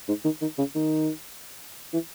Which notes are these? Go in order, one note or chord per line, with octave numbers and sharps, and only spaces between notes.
G#2
D#3
D#3
C#3
D#3
E3